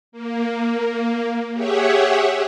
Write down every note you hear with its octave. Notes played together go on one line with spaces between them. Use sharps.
A#3
G4 G#4 C#5 E5 F#5